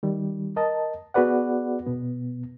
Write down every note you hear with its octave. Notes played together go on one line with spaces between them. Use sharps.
D#3 G3
A#4 D#5 A5
B3 F#4 G#4 B4 D5 F#5
B2 B3